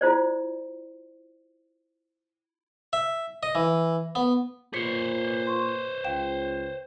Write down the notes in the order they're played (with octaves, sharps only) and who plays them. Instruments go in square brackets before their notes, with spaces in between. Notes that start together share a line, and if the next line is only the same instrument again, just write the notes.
[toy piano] E4 F4 C5 D5
[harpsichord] E5
D#5
E3
B3
[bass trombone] A#2 [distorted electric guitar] C5 C#5 [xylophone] B6 C#7
[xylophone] C6 C#6
[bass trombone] C#2 [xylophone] F5 G5 E7